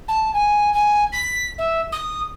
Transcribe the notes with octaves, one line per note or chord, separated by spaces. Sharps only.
A5
G#5
G#5
B6
E5
D#6